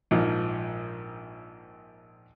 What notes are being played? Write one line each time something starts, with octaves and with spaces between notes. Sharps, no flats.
A#1 G#2 F3